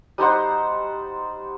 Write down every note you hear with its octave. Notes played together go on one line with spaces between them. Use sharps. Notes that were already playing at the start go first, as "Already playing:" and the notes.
G3 D#4 C5 F#5